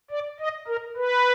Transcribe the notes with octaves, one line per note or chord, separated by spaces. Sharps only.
D5
D#5
A#4
B4